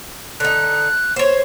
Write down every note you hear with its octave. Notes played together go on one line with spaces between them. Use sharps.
D3 D#4 F#6
C5 C#5